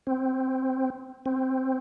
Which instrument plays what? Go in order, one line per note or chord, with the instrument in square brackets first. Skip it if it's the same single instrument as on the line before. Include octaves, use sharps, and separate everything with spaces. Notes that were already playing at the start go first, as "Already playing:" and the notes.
[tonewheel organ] C4
C4